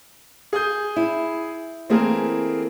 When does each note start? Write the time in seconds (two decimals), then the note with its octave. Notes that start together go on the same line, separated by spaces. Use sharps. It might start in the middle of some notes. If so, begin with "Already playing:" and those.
0.53 G#4 D#6 G6
0.96 E4
1.90 E3 A3 A#3 C4 G#4 A#4